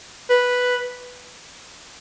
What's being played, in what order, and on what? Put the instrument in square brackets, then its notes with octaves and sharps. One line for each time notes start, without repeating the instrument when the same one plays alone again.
[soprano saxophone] B4